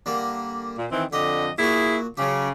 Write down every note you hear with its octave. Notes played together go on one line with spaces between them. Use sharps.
D3 G3 A#3
A#2
D#3 E3 C4
F2 D3 G4 D#5
A#2 E4 F#4 G#4
C#3 F#3 G4